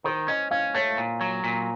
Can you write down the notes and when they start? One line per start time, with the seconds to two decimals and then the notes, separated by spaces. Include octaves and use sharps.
0.04 D#3 C5
0.28 C#4 D#5
0.51 C#4 F5
0.75 A3 C#5
0.98 A#2
1.21 F#3
1.44 A#2